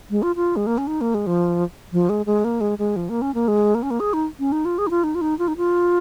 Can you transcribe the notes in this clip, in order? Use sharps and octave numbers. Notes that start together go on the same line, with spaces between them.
G#3
F4
F4
G#3
A#3
C#4
D#4
A#3
G#3
F3
F3
G#3
G#3
A#3
G#3
G#3
F3
A#3
C#4
A#3
G#3
A#3
C#4
A#3
G#4
D#4
C#4
D#4
F4
G#4
D#4
F4
D#4
F4
D#4
F4
D#4
F4